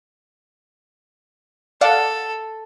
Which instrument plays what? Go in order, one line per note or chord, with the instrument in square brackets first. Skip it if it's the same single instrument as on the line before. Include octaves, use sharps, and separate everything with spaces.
[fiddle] A4 [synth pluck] D5 F5 F#5